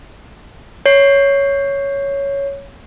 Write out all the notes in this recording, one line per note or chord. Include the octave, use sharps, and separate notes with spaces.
C#5 C7